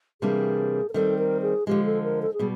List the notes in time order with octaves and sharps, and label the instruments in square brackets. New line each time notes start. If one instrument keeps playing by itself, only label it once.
[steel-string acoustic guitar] C3 E3 G3 A#3 D4 [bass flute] G#4
[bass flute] A#4
[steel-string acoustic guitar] D#3 G3 C4 [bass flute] A4
[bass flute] A#4
G#4
[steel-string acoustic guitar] D3 F3 G#3 [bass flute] G4
[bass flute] A4
A#4
A4
G#4
[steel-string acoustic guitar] B2 G3